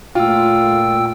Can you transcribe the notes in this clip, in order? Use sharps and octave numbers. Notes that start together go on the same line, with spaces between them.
A#2 A3 A#3 F4 G5 E6